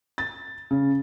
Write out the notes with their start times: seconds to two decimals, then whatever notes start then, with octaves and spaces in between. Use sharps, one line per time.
0.18 A6
0.71 C#3